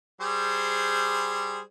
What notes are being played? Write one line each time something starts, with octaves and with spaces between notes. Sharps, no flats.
G3 G#4 C5